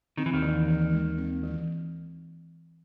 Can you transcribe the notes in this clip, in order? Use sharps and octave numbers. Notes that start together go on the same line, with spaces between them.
D#3 C4
E3
D#2 D#3
E3
E3
G#3
C4
E3